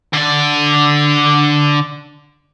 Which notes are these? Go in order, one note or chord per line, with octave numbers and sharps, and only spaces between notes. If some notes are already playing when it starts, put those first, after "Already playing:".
D3 D5